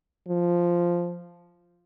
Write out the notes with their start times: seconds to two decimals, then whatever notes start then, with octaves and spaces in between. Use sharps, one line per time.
0.29 F3